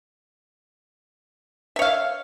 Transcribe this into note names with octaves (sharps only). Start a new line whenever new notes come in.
C#5 E5 F5